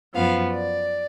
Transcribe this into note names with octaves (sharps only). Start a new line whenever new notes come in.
F#2 F3 B3 F5
D5